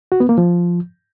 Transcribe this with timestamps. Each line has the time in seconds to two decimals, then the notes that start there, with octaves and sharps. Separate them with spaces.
0.12 F#4
0.20 B3
0.29 A#3
0.38 F3